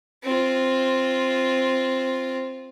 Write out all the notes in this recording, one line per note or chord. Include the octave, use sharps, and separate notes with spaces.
C4 F4